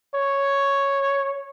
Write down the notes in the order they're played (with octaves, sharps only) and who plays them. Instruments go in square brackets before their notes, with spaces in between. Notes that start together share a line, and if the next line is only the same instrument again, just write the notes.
[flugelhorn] C#5